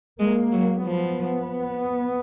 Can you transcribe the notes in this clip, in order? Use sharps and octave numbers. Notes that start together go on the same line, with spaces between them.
G#3 A#3
F#3
F3 B3